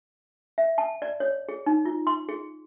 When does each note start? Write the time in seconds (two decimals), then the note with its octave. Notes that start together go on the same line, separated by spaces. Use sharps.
0.58 E5
0.78 A5
1.02 D5
1.20 C#5
1.49 G#4
1.66 D#4
1.85 F4
2.07 C6
2.29 G#4